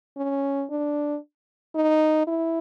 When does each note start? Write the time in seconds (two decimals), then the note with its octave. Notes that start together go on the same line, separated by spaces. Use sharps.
0.18 C#4
0.70 D4
1.75 D#4
2.27 E4